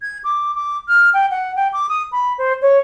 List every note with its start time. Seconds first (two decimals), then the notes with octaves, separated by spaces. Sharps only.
0.02 G#6
0.24 D6
0.55 D6
0.88 F6
1.14 G5
1.31 F#5
1.56 G5
1.73 D6
1.89 D#6
2.12 B5
2.38 C5
2.62 C#5